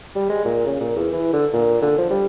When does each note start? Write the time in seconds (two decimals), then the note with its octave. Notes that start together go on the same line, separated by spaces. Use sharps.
0.15 G3
0.29 G#3
0.45 A#2
0.66 C#3
0.80 A#2
0.96 E2
1.13 E3
1.33 D3
1.53 A#2
1.82 D3
1.98 F3
2.10 G3